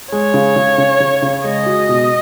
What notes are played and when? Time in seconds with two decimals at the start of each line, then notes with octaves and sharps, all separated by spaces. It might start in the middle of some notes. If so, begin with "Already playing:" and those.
0.12 G#3 C#5
0.34 C#3
0.56 C#3
0.78 C#3
1.00 C#3
1.22 C#3
1.44 G#3 D#5
1.66 F#4
1.89 B2